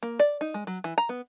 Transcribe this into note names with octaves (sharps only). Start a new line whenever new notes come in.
A#3
D5
D#4
G#3
F#3
E3
A#5
B3